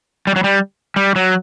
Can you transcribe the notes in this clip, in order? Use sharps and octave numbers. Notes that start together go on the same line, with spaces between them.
G3
F#3
G3
G3
F#3